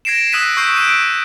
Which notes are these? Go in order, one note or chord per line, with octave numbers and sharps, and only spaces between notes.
G#6 A#6 C7 D7 E7
D#6 E6 F#6 G#6 B6 D#7
C#6 E6 F#6 G6 B6 C7
E6 F#6 D7 D#7